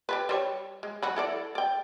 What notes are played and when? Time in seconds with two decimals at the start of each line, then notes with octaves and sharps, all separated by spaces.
0.09 G4 A4 B4
0.29 G3 C5 C#5
0.83 G#3
1.02 F#3 F#4 B5
1.16 E4 A4 D5
1.55 D5 G5